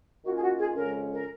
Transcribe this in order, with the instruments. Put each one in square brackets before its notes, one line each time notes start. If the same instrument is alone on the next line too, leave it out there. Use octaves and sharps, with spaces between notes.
[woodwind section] D#3 A#3 C#4 F4 [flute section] F#4
[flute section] G#4
F#4
G#4
[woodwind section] F2 C#3 G#3 C#4 [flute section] A#4
[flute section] A#4